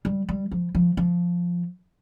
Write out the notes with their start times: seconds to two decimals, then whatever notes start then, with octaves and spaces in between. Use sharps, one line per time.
0.05 G3
0.29 G3
0.51 F3
0.75 F3
0.97 F3